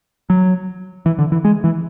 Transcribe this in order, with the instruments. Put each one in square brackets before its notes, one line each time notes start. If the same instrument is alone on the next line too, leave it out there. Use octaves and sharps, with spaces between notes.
[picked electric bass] F#3
E3
D3
E3
G#3
E3